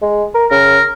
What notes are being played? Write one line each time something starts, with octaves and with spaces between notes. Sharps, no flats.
G#3
A#4
C#3 A#4